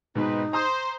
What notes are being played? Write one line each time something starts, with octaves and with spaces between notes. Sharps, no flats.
G#2 B2 C4 D#4 B4
C5 A#5 D#6 G6